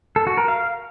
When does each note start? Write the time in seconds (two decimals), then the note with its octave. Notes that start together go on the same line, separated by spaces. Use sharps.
0.16 A4
0.27 F#4
0.37 A#4
0.48 F5